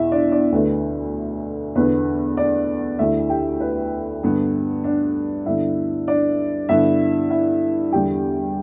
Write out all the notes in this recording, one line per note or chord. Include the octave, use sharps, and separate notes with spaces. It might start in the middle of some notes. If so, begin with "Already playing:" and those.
Already playing: E2 B2 E4 E5
D4 D5
D4 D5
D2 D3 A3 B4
E2 D3 B3 B4
D4 D5
D2 D3 A3 E4 E5
G4 G5
B4
G2 D3 B3
D4 D5
G2 D3 B3 E4 E5
D4 D5
G2 D3 B3 E4 E5
E4 E5
E2 D3 G3 B3 G4 G5